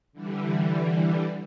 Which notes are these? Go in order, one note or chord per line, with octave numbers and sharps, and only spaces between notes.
D3 E3 G3